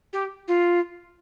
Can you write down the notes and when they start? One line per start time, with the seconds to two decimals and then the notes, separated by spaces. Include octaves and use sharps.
0.13 G4
0.47 F4